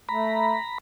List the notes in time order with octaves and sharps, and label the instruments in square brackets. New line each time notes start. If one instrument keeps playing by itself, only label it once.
[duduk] A3 [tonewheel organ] A#5 B5